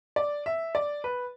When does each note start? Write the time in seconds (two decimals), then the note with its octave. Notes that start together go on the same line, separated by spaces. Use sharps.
0.16 D5
0.46 E5
0.75 D5
1.04 B4